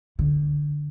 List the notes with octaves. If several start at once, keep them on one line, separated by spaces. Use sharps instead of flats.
D3